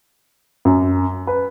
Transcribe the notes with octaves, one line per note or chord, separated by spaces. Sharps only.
F#2
B4